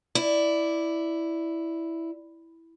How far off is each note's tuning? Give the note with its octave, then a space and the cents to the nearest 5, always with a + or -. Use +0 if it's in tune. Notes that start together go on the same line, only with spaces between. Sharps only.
E4 +0 D5 +0